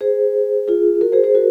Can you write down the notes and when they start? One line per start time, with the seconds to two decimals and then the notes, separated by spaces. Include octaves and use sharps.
0.01 G#4 C5
0.68 F4 G#4
1.01 F#4 A#4
1.12 G#4 C5
1.24 G#4 C5
1.35 F#4 A#4